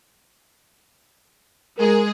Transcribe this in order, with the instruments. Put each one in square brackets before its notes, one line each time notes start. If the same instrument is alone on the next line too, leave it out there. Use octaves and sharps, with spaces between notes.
[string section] G#3 G#4 [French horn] A#4